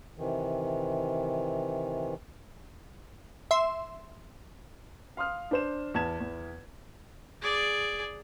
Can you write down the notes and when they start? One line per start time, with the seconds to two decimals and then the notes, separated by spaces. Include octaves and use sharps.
0.18 C3 D#3 E3
3.51 E5 C6
5.17 F5 C6 D#6 F6
5.51 D4 C5 E7
5.94 E2 A5 G#6 E7
6.20 E2
7.41 G#4 D5